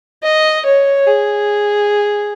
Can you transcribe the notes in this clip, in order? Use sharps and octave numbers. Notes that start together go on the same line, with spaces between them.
D#5
C#5
G#4